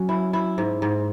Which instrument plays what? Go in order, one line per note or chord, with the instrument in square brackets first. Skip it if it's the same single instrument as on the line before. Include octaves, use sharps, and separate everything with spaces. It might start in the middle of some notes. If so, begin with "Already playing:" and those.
Already playing: [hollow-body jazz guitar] F#3 [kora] C#4
[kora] E4
E4
G#2
G#2